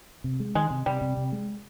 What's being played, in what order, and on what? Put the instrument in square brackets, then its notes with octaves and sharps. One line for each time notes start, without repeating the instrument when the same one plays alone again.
[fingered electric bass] C3
G#3
[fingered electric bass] D#3 [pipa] G#3
[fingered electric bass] C3
[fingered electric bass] C3 [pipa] G3
[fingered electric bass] C3
C3
G#3